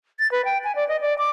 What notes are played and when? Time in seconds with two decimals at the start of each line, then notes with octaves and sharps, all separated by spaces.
0.19 A6
0.32 B4
0.45 G5
0.64 G#5
0.76 D5
0.88 D#5
1.01 D5
1.18 D6